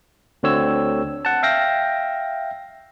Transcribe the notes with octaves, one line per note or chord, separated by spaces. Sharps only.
D2 D3 C4 C#5 E6
F#5 A5
E5 F5 G5 A#6